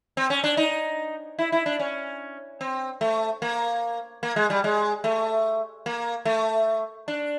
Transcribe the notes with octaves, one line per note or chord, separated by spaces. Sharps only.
C4
C#4
D4
D#4
E4
E4
D4
C#4
C4
A3
A#3
A#3
G#3
G3
G#3
A3
A#3
A3
D4